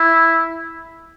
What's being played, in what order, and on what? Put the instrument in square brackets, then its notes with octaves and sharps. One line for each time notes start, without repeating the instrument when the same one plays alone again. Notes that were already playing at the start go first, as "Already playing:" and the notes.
Already playing: [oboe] E4